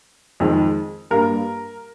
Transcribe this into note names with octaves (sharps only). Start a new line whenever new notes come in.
F2 D#3 G#3
G2 G3 A#3 A#4